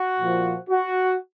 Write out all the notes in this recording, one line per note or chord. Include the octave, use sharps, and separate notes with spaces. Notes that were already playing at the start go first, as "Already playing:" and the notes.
Already playing: F#4
A#2 F3
F#4